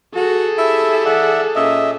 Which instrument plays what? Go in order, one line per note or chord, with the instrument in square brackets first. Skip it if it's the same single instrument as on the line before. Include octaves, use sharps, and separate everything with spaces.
[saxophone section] F#4 [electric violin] G#4 A4
[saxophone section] E4 G4 [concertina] E5
[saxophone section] E3 D5 F#5 [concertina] E5
[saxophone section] A#2 A#3 C#4 [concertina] D#5 E5